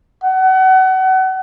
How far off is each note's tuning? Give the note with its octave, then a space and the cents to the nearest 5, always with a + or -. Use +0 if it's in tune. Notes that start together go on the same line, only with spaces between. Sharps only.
F#5 +30